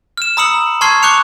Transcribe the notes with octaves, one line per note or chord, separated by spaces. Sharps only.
F6 E7
A#5 B5 D#6 E6 C#7 F#7
A5 C6 C#6 F6 G#6 C7
C#6 D6 F#6 G6 C#7 F7